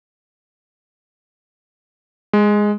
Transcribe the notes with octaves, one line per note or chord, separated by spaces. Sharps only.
G#3